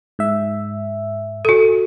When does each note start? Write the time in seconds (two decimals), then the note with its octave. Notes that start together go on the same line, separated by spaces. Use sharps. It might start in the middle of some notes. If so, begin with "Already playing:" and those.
0.19 G#2 E5
1.45 F#4 A4